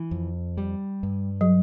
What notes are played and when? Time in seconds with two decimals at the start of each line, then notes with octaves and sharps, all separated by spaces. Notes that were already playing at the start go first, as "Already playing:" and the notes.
Already playing: E3
0.11 F2
0.57 G3
1.03 G2
1.41 F#3